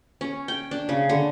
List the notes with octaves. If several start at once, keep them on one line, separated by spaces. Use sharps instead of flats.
C#4
G5
D4
C#3
D3